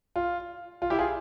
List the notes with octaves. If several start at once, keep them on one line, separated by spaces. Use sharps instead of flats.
F4
F4
E4 G4
F4 G#4